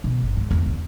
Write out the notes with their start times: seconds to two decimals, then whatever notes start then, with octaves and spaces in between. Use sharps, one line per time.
0.04 B2
0.22 G1
0.37 G#2
0.51 E2
0.66 E2 D3